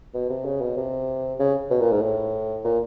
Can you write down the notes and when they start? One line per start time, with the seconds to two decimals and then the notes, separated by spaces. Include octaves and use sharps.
0.14 B2
0.30 C3
0.45 C#3
0.61 B2
0.77 C3
1.39 C#3
1.71 B2
1.81 A#2
1.91 G#2
2.02 A2
2.64 A#2